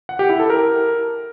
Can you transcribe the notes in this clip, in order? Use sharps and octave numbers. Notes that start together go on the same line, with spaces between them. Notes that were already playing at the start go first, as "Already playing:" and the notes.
F#5
G4
E4
A4
A#4